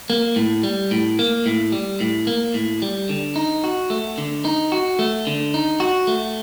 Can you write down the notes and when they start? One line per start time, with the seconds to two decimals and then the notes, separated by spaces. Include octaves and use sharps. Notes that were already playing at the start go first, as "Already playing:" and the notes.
0.10 A#3
0.36 A2
0.63 G3
0.91 A2
1.19 A#3
1.46 A2
1.72 G3
2.01 A2
2.27 A#3
2.54 A2
2.82 G3
3.09 D3
3.36 D#4
3.64 F#4
3.90 A3
4.18 D3
4.45 D#4
4.72 F#4
4.99 A3
5.27 D3
5.54 D#4
5.80 F#4
6.07 A3